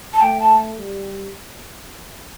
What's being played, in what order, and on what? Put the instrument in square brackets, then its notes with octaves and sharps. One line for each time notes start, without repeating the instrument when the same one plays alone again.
[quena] A5
[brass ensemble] A3 [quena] G5
[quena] A5
[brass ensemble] G3